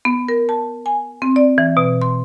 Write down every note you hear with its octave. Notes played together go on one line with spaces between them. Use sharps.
B3
A#4
A5
G#5
C4
D5
E3
B2
C6